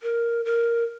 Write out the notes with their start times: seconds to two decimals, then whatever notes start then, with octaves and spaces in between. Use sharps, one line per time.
0.02 A#4
0.45 A#4